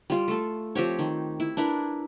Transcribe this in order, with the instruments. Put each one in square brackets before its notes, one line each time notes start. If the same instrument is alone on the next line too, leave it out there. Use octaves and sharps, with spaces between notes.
[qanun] G3 F4
A3 A4
F3 C4 G4 C#5
D#3
E4
D4 E4 A#4 B4